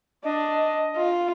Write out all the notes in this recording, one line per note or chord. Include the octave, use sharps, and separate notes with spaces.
D4 D#5
F4